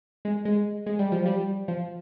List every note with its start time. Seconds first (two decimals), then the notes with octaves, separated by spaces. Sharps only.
0.25 G#3
0.45 G#3
0.86 G#3
0.99 G3
1.12 F3
1.26 G3
1.68 F3